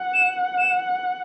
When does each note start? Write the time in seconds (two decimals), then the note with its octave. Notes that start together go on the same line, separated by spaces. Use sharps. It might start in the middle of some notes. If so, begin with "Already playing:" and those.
Already playing: F#5
0.14 E7
0.58 E7